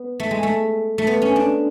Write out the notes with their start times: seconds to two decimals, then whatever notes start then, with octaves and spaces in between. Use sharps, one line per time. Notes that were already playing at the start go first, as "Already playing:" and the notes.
Already playing: B3
0.20 A3
0.31 G#3
0.43 A3
0.98 A3
1.07 B3
1.22 C#4
1.36 D4